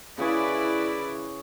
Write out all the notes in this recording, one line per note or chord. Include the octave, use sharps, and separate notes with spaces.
C#3 E4 G#4 B4 C#5 D5